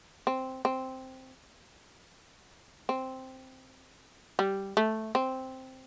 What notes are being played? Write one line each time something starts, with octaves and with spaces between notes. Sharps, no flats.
C4
C4
C4
G3
A3
C4